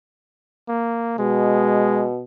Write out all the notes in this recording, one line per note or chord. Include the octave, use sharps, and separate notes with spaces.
A#3
B2 G#3